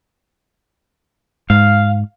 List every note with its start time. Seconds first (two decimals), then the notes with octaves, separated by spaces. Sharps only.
1.50 G#2 F5